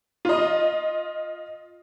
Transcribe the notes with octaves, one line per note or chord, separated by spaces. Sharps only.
F4 D#5